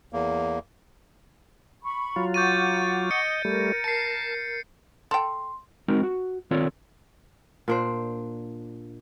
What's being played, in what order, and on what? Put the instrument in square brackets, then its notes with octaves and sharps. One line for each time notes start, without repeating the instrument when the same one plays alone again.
[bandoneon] E2 A#3
[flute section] B5 C#6
[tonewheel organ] F#3 F4
[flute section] F#5 C#6 D6 [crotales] G6 A6 D#7
[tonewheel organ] D#5 [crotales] C#7
[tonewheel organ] G3 A3 [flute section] A#4
[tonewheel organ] A5 [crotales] C7 C#7
[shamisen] A4 G5 [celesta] C6
[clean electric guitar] G#3 C4 D#4 F#4 A#4
F#4
D#3 C4 F4 A4 C#5 D5
[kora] A#2 D4 C5